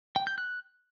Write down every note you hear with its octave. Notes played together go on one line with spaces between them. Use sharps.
G5
G6
F#6